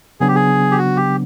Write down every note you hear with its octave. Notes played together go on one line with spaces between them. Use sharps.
C#3 F#3 B3 D4 G#4
G4
G#4
G4
F#4
G4